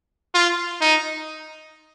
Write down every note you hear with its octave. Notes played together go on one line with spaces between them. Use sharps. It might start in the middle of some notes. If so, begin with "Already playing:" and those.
F4
D#4